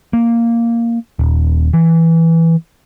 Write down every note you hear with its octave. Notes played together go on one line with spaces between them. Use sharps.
A#3
D#1
E3